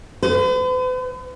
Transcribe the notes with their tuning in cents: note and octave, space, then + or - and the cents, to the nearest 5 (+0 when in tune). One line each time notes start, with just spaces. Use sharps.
B4 +45